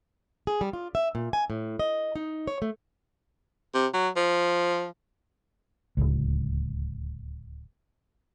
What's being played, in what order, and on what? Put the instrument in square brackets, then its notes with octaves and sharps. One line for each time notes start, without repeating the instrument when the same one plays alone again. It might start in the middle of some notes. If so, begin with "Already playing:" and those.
[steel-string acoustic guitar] G#4
G3
F4
E5
A#2
G#5
A2
D#5
D#4
C#5
A3
[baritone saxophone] C3
F#3
F3
[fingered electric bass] D1 G#1 C#2